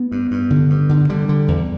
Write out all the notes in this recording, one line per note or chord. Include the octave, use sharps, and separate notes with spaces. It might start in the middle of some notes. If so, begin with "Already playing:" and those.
Already playing: B3
G2
G2
D3
G2
D3
D3 G3
D3
E2